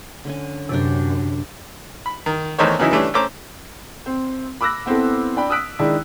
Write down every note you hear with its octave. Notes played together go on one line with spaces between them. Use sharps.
D3 C#4 G#5
F#2 C3 D4 G4 D5
B5
D#3
E2 D#3 A3 D#4 C5 C#5
C#3 E3 F#3 D#4 E4
E3 G3 A3 C#4 D4
A3 C#4 C5 A#5 D6
C4
B5 D6 E6 F#6 A#6
B3 C4 E4 A4
D4 G5 B5
D#6 E6 F#6 B6 D7
D#3 G#3 D4 E4